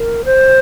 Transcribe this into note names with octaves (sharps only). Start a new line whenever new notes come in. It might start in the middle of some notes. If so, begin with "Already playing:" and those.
Already playing: A#4
C5